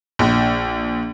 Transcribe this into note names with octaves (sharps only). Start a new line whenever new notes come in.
A#1